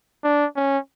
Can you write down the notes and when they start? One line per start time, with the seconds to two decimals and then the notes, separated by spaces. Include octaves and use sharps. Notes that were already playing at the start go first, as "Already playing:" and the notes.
0.24 D4
0.56 C#4